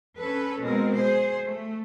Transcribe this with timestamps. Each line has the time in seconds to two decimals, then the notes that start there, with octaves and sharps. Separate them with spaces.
0.17 C#4 A4 B4
0.62 B2 G#3 C4 A#4
0.95 G#4 C5
1.44 A3